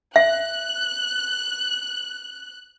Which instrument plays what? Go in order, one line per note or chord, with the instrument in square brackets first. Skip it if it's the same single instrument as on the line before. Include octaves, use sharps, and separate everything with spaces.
[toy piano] E5 [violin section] F#6